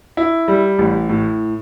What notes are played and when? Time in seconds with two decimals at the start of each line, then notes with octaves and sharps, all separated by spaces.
0.17 E4
0.48 G3
0.79 A1
1.09 A2